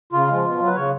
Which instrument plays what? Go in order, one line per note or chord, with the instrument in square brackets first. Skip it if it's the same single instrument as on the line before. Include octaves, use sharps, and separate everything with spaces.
[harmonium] C#3 F4
G#3
F3
B2
F#3
B4
C#3 C#5